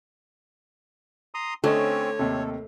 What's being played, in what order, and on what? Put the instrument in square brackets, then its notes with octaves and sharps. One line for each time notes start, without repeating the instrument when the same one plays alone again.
[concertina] A#5 C6 D#6
[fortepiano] D3 D#5 [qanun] A3 [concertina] C4 C#4 [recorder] C#5
[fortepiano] D#2 C3 [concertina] A4